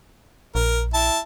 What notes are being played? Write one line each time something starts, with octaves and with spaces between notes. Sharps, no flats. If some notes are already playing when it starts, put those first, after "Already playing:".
A#1 A#4
E4 A5